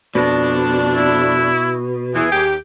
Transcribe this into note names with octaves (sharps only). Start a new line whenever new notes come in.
F2 B2 D4
E4
E2 E3 G#4
D#2 G4